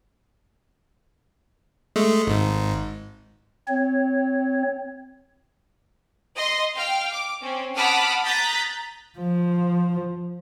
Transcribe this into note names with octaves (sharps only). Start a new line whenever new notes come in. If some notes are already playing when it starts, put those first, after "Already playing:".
G#3 A3
G#1 G#2
C4 C#5
D#5 C6
F5 G5 F6
D6
C4 C#4
F#5 A5 B5 D6 D#6 F6
A#5 D#6 F#6 G6 A6 B6
F3